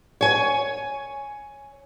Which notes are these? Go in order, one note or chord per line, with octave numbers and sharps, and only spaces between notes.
C#5 G#5